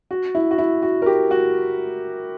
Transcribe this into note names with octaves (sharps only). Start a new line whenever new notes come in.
F#4
E4
F#4
E4
F#4
A#4
G4
F#4